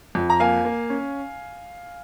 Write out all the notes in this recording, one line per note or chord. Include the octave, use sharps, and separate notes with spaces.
F2
A#5
A#3 F5 G#5
A#3
C#4